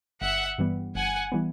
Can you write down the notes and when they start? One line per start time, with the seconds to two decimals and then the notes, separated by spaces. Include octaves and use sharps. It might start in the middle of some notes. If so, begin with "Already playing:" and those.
0.21 G1 E5 F#5
0.58 G2 E3 G3 B3
0.95 G1 F#5 G#5
1.32 E3 G3 B3